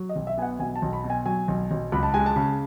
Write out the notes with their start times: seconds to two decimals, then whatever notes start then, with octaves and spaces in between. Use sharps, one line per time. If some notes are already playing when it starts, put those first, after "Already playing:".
Already playing: F#3
0.09 D#5
0.16 B1
0.27 E5
0.38 B3 G#5
0.42 F#5
0.59 B1 G#5
0.76 A5
0.82 B1
0.93 B5
1.04 B2
1.10 G#5
1.26 F#3 G#5
1.48 B1
1.71 B1
1.92 C#2 B5
2.03 A5
2.14 G#3 G#5
2.26 A5
2.36 C#3